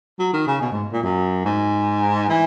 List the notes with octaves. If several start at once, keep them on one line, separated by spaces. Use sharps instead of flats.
F#3
D#3
C#3
B2
G#2
A#2
F#2
G#2
E3